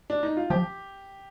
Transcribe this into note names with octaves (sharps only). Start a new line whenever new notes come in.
D4
D#4
F4
F3 G4